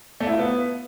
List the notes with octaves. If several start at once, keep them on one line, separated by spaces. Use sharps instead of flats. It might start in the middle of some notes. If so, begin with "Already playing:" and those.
A3
E4
F4
B3